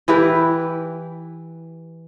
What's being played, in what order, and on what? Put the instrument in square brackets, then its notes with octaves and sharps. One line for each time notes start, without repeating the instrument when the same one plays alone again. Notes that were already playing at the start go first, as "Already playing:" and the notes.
[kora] E3 E4 G4 B4